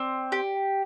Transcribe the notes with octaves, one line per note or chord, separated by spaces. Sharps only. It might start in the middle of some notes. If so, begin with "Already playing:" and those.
Already playing: C4 D5
G4